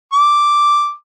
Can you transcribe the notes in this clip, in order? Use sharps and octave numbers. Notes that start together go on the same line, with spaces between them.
D6